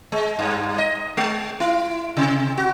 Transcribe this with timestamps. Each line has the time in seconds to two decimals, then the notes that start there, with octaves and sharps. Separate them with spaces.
0.12 G#3
0.39 G2
0.78 D#5
1.17 G#3
1.60 E4
2.17 C3
2.58 F#4